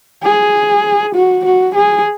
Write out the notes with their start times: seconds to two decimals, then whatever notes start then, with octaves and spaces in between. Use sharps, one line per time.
0.24 G#4
1.15 F#4
1.45 F#4
1.75 G#4